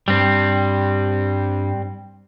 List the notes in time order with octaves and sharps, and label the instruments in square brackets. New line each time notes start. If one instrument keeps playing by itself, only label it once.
[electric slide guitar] G2 [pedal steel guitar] G3 C4